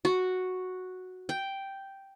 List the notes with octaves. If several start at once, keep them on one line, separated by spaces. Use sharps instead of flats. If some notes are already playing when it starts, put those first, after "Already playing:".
F#4
G5